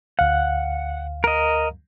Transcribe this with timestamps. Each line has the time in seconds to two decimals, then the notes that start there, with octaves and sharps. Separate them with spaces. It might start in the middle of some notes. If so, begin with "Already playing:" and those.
0.19 D2 F5 F#5
1.24 A#4 D#5